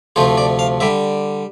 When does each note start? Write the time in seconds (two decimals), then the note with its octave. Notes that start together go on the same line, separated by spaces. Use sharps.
0.16 D2 C3 F3 A3 C5
0.38 D5
0.59 F5
0.80 D3 G3 E5